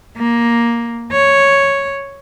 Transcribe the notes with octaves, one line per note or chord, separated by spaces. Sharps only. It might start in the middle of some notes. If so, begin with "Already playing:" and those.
A#3
C#5